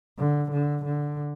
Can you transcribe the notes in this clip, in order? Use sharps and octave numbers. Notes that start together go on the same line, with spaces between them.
D3
D3
D3